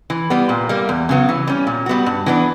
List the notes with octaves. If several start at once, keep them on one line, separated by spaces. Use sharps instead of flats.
E3
G3 B3
A#2
G3 A#3
E2
C#3 F#3 B3
E3
G3 C#4
A#2
G3 B3 F#4
G2
E3 B3 D4